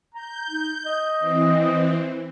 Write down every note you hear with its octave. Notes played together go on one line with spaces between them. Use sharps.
A#5 G6
D#4
D#5
E3 C4